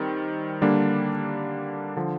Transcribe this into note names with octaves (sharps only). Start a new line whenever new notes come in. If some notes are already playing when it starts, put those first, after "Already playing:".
Already playing: D#3 G3 C4
D3 G3 A#3 D4
D3 F3